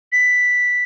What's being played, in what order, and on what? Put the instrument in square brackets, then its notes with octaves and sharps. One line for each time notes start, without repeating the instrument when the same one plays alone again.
[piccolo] B6